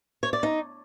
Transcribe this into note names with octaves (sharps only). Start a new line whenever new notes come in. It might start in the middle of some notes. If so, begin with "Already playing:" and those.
C#5
D5
D#4